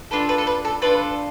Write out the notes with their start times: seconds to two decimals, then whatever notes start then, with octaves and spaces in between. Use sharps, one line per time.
0.11 D4 F4 A4 B4
0.29 B4
0.38 A4
0.47 B4
0.65 A4
0.82 D4 F4 A4 B4